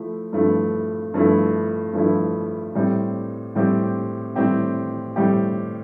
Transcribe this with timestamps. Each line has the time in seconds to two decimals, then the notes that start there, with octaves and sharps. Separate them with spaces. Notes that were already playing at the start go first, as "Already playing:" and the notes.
Already playing: F3 A3 E4
0.32 G2 F3 A3 E4
1.14 G2 F3 A3 E4
1.93 G2 F3 A3 E4
2.75 A2 G3 C4 G4
3.55 A2 G3 C4 G4
4.36 A2 G3 C4 G4
5.16 A2 G3 C4 G4